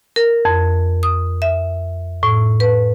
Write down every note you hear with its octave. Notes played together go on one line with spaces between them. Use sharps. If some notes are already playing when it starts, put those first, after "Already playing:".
A#4
F2
D#6
E5
A2
B4